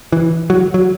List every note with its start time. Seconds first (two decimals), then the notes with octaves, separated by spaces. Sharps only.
0.12 E3
0.50 F#3
0.74 F#3